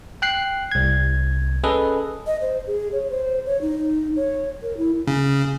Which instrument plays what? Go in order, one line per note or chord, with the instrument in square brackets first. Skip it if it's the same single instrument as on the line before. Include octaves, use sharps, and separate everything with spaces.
[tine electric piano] G5 F#6 C7
C2 G#6
C#4 G#4 A4 B4 D#5
[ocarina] D#5
C5
G#4
C#5
C5
C#5
D#4
C#5
A#4
E4
[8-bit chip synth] C#3